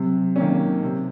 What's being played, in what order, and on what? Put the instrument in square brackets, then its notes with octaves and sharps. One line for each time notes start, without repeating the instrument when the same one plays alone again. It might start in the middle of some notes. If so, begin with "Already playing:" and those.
Already playing: [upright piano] C3 [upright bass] F#3
[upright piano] D#3 A#3 C#4
C3